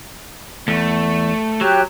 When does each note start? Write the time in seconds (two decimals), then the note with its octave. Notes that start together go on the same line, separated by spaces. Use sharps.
0.68 E2 A3
1.61 F#3 G4 C#5 F#6